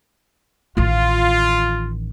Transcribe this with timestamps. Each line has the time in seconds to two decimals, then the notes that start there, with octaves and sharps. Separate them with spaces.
0.77 A1 D#3 F4